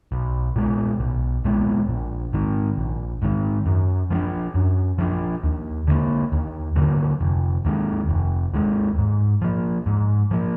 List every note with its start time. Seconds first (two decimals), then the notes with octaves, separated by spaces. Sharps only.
0.12 B1
0.56 A#2 G#3 B3
1.00 B1
1.45 A#2 G#3 B3
1.89 A#1
2.33 G#2 D#3
2.78 A#1
3.22 G#2 D#3
3.66 F#2
4.10 F3 B3 D4
4.55 F#2
4.98 F3 B3 D4
5.44 D#2
5.87 D3 F#3 A#3
6.32 D#2
6.76 D3 F#3 A#3
7.21 F1
7.65 D#2 D#3 G#3
8.09 F1
8.54 D#2 D#3 G#3
8.98 G#2
9.42 F3 A#3
9.86 G#2
10.31 F3 A#3